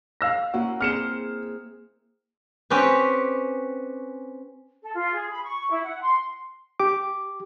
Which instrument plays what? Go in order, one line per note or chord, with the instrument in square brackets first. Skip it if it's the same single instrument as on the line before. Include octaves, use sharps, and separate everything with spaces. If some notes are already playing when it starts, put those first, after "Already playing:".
[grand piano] F5 E6 A#6
[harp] A#3 C#4 E4 [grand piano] F#4
[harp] C4 G#4 C5 [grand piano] F6 C#7 E7
[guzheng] C4 C#4 G4 B4
[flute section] A4
F4
G#4
B5
C#6
E4
F#5
C6
[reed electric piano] G4 D6